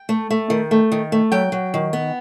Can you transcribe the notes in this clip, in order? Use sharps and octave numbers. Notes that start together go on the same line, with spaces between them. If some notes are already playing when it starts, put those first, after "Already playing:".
Already playing: G5
A3
A3
D#3
A3
D#3
A3
F#3 G5
F#3
D#3
B3